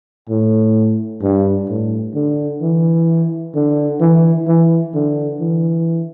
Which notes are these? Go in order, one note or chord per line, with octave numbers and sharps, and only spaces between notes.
A2
G2
A2
D3
E3
D3
E3
E3
D3
E3